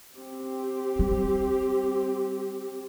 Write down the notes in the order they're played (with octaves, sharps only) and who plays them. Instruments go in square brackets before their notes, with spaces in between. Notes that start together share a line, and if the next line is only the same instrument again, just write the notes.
[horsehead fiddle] C4 G4
[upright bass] G3